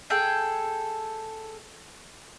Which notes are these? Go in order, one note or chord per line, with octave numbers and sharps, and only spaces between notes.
G#4 A4 G5